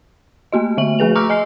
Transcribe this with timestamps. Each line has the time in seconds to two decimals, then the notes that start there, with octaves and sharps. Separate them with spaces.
0.52 A3 A#3 F#4 D#5
0.77 D3 A3 E5 F#7
0.99 F3 A3 G#4 B4 F7
1.16 A#5 C#6 D6 E6 F6
1.29 D#5 G#5 F6 C7